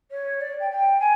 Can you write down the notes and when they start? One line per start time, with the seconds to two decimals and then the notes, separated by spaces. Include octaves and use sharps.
0.11 C#5
0.41 D5
0.60 G5
0.71 G5
1.00 G#5